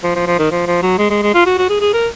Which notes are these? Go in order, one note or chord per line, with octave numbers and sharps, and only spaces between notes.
F3
F3
F3
D#3
F3
F3
F#3
G#3
G#3
G#3
F4
F#4
F#4
G#4
G#4
A#4